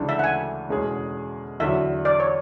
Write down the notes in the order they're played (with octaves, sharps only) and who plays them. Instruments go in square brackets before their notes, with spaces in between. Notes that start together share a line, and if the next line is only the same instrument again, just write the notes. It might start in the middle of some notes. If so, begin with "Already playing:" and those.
Already playing: [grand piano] D2 C#3 E3 G#3 D4
[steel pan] E5
F#5
G#5
[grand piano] E2 B2 G#3 C#4 G#4
[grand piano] E2 D3 F#3 [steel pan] E5
[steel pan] D5
C#5